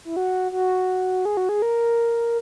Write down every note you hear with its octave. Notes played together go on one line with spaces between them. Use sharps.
E4
F#4
F#4
G#4
F#4
G#4
A#4